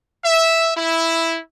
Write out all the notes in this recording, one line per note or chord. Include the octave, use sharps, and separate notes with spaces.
E5
E4